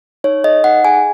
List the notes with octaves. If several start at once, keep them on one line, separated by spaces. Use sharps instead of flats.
D#4 C#5
A4 D#5
D#4 F#5
G#4 G#5